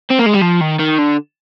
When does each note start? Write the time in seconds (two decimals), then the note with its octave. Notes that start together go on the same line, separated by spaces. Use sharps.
0.11 C4
0.19 A#3
0.26 G#3
0.34 G3
0.42 F3
0.61 D#3
0.80 D#3
0.99 D3